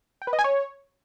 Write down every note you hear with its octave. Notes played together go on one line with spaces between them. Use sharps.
G5
B4
D#5
G#5
C#5